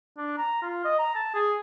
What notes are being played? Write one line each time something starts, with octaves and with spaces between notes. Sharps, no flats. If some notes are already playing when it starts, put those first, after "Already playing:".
D4
A#5
F4
D#5
A#5
A5
G#4